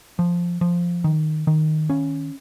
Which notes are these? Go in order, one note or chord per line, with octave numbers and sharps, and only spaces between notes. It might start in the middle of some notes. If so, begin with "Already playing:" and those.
F3
F3
D#3
D#3
C#4